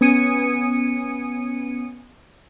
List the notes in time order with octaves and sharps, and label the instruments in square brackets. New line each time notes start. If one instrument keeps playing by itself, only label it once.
[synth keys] B3 C#4 G#5 D#6 C#7 D#7